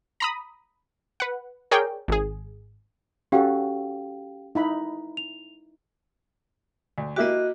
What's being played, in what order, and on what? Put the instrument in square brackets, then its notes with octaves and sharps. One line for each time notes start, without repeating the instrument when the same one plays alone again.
[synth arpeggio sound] A#5 B5 D#6
B4 F#5
G#4 A#4 C#5 D5 G5
G#1 G#4
[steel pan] C#4 F#4 A4 [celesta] G4 F5 G5
[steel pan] D#4 E4 B5
[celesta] F7
[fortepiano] D2
[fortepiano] A#3 E4 G4 [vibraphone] F#4 D#5